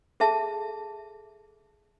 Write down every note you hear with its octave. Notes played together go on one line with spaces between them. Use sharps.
G#4 A4 E5 A5